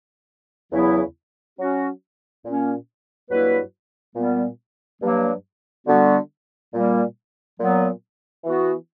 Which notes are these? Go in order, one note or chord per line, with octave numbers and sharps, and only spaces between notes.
E2 C#3 F#3 B3 E4
F#3 C#4 F#4
A#2 A#3 C#4
G2 F#3 A#3 E4 B4
A#2 G3 B3
G2 F#3 A#3
D3 G3 B3 F#4
A#2 G3 A#3
A#2 F#3 B3
E3 B3 F#4